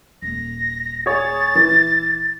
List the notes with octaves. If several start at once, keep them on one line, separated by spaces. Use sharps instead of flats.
D#1 A#3 A#6
G#4 C#5 A6
E3